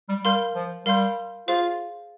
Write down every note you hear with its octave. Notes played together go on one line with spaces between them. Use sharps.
G3
G3 A#4 F5 C6 G6
F3
G3 A#4 F5 C6 G6
F4 G#4 C5 F5